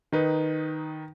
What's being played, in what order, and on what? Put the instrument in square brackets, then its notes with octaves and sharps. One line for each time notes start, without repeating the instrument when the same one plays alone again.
[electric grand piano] D#3 D#4 B4